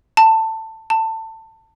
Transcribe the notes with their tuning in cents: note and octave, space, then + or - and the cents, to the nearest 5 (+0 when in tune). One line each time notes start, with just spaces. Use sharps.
A5 +15
A5 +20